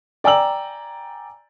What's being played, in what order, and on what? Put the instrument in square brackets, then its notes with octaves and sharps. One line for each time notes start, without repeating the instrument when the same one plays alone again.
[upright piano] D5 G5 G#5 A#5 E6 F#7